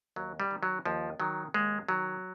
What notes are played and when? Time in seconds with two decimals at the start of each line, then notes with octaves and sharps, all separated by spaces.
0.16 D#2 F#3
0.40 G3
0.51 D#3
0.63 F#3
0.85 D#2 F3
1.20 D#3 F#3
1.54 D#2 G#3
1.89 D#3 F#3